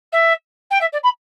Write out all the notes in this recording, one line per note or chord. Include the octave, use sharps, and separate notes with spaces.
E5
G5
E5
D5
B5